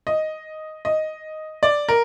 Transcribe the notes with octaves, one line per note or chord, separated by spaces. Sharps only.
D#5
D#5
D5
A#4